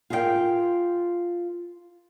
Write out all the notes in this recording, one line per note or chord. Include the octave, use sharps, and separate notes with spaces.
F4 G#4 A#4 D#5 G5